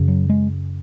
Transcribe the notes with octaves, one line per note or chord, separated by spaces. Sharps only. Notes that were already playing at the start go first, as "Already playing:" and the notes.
Already playing: F#2 C#3
F#3
G#3